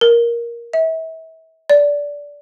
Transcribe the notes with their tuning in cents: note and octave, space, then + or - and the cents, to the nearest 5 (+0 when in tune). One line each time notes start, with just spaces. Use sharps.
A#4 +10
E5 -35
D5 -15